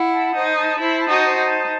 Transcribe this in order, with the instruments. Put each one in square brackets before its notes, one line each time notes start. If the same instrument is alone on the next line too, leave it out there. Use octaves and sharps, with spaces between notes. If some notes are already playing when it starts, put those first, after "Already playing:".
Already playing: [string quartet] E4 [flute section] F#5
[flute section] A5
[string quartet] D#4 [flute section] C5
[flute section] A5
[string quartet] E4 [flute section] C5
[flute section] A5
[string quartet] D#4 F#4
[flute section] C5
[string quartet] D#4
[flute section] A5